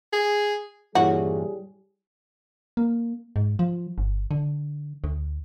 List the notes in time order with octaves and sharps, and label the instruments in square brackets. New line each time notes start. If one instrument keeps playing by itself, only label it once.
[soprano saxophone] G#4
[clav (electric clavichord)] G2 A#2 E3 [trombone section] G3 G#4 [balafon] E4 C#5 [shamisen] F#4
[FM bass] A#3
G#2
F3
G1
D3
D2